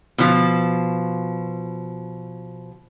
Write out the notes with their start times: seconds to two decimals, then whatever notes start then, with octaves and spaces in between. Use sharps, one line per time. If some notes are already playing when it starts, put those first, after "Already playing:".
0.18 B2 F3